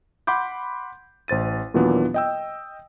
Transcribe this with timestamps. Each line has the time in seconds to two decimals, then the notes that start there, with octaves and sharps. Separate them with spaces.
0.27 F#5 B5 C6 D6 G6
1.28 A1 C5 A6 D#7
1.74 D#2 A#2 E3 F#3 B3 D4
2.14 D#5 G5 E6